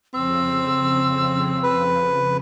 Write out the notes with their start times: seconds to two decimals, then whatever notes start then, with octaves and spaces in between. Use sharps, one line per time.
0.14 F2 C#3 F3 C4 E6
1.63 B4